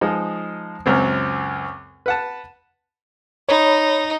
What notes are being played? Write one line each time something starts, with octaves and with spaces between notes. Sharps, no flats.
F3 G#3 D#4
C#2 F#2 C4
B4 F#5 A5
D#4 C#5 B5